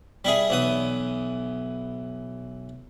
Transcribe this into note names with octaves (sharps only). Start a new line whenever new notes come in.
G3 E4 G#4
B1 E3 D#6